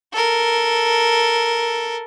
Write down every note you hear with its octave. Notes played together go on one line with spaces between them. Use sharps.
A4 A#4